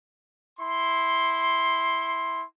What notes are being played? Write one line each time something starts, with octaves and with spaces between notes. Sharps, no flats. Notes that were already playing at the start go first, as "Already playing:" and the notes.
E4 C6